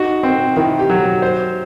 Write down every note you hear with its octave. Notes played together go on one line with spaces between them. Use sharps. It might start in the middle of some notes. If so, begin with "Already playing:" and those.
Already playing: D#4 F#4
C4
D#3 E4
G4
F#3 F#4
C5